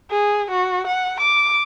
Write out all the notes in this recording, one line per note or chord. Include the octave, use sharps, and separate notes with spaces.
G#4
F#4
F#5
D6